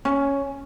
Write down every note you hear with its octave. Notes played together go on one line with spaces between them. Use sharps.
C#4